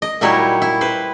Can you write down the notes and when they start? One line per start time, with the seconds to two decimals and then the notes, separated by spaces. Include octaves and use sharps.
0.02 D#5
0.21 A#2 F#3 G3 D#4 E4 C#5
0.62 E4
0.81 B4 C5